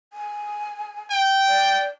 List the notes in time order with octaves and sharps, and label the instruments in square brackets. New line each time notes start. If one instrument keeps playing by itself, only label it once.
[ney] G#5
[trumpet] G5
[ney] D5